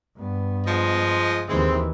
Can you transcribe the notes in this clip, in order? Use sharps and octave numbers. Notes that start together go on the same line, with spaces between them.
G2 B3
F3 G#3 D#5
D#2 E3 G#3 C4